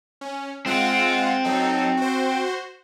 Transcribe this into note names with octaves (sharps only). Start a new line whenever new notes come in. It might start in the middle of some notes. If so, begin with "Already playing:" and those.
C#4
G#3 C4 F4 F#5
F#3 D#4 A4
F#4 C5